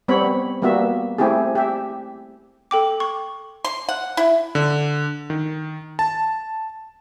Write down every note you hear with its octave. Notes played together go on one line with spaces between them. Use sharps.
G3 B3 C4 C#5 B5
G3 A#3 B3 F#4 E5
A3 C4 E4 G4 G#4
G4 E5
A4 G5 D6
C#6
C6
F#5
E4
D3
D#3
A5